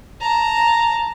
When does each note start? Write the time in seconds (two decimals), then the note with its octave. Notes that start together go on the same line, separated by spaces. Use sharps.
0.21 A5 A#5